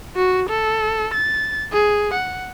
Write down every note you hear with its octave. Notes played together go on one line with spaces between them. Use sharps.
F#4
A4
A6
G#4
F#5